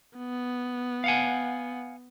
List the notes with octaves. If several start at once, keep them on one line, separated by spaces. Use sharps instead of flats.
B3
F5 F#5 G#5